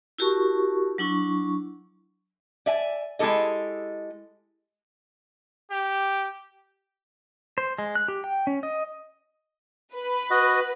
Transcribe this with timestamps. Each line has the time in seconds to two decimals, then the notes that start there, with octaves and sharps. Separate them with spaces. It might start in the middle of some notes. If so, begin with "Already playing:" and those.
0.18 E4 F#4 G4 A#4 A5 C#6
0.98 F#3 D4 E4 C#6
2.66 D5 E5 G#5
3.19 G#3 E4 G4 A4 D#5
5.71 G4
7.58 C5
7.78 G#3
7.95 F#6
8.08 G4
8.24 G5
8.47 C#4
8.63 D#5
9.94 B4
10.30 F#4 D#5